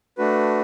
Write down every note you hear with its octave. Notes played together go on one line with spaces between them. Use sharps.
A3 D4 F#4 B4